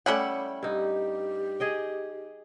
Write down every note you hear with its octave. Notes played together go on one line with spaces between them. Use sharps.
G3 A3 C#4 E4 F#5 G5
G2 D#4 G4
G#4 D#5 G5